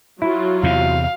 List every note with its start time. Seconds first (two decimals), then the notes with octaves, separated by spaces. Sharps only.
0.22 F#3 E4 F4
0.63 E2 C3 F5